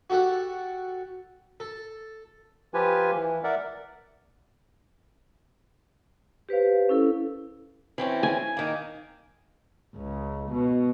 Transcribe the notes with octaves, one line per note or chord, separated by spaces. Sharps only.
F#4 G4 A4 F#5
A4
F3 F4 G4 B4 G#5
E3
A#4 D5 E5 F#5
G4 B4 C5 F5
C#4 E4 A4
E3 C4 C#4
G#5
D#3 A#3
C#2
B2